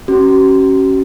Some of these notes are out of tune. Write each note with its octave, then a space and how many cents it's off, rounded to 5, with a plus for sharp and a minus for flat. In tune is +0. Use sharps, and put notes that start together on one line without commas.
C#4 -15 F#4 +45